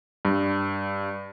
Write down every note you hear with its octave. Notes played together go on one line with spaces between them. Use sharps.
G2